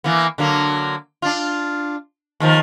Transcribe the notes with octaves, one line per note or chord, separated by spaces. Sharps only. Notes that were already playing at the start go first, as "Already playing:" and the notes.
E3 A#3 B3
D3 F#3 A#3
D4 F4
D#2 D#3 F3